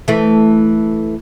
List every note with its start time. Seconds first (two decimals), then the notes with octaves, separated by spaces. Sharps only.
0.08 E3 A3